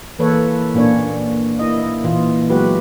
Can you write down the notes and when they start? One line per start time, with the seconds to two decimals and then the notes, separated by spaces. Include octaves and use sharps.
0.19 E3 A#3 A4 B4 C#5
0.74 A#2 A#3 C#4 D4 C#5
1.59 A#3 E4 D#5
2.04 A#2 E3 F4
2.50 F#3 G#3 B3 F#4 G4 B4